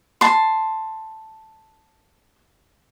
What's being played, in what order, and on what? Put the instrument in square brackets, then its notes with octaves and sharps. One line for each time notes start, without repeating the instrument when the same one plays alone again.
[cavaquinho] A5 C6